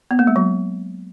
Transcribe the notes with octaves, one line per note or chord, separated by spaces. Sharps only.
B3
A#3
G#3
F#3